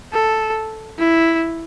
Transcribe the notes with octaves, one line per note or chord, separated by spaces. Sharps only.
A4
E4